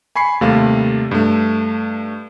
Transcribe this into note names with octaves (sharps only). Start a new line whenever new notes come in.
G#5 B5 C#6 C7
D#2 C3 G3 A3 F5
G2 A3